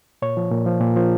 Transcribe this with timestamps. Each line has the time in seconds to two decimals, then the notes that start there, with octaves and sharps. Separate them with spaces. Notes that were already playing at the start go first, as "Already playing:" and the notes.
0.22 A#2 C#5
0.37 F3
0.52 A#2
0.66 F3
0.81 A#2
0.96 F3